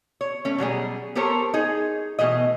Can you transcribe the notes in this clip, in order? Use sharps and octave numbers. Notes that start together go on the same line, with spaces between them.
C#5
A3 C#4
B2 F#3 G3 G#4
B3 G4 A4 A#4 C5 C#5
D#4 G#4
B2 E3 A3 D#5